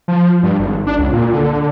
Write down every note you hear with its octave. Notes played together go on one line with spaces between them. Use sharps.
F3
G2
G#1
D4
C#2
A#2
D3